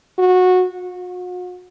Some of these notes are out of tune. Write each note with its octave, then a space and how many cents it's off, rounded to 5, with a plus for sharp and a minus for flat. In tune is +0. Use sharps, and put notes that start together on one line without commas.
F#4 -15
F#4 -45